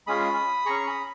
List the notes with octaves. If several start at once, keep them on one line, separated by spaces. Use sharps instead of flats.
G#3 C#4 F4 G#4 B5 D#6
C#4 G#4 A#5 C#6
C#6
B5 D#6